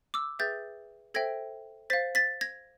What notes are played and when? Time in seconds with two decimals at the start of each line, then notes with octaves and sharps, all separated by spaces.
0.14 D6 E6
0.39 G#4 B4 E5 G5 G6 A6
1.14 A4 C5 E5 G5 G#6 A#6
1.90 C5 F5 A6 B6
2.15 A6 B6
2.41 G#6 A#6